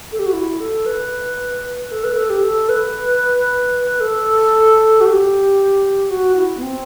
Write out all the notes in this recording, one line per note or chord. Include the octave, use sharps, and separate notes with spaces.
A4
G4
F#4
E4
A4
B4
A4
B4
A4
G4
A4
B4
A4
F#4
G4
F#4
E4
B3
C4